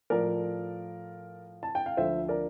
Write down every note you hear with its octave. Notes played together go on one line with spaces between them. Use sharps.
A2 F3 A3 A#4 D5
A5
G5
F5
D2 D3 F3 C5 E5
A#4 D5